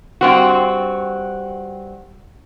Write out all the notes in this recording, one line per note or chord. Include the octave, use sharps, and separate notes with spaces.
G2 C4 F#4